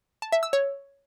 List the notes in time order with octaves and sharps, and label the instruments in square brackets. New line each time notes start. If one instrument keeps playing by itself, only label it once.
[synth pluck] A5
E5
E6
C#5